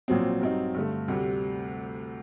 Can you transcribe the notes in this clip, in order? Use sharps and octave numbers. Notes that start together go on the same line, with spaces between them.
A#1 A#2 F#3 C4
G2 F#3 C4 D#4
G2 D3 A3
D2 C3 G3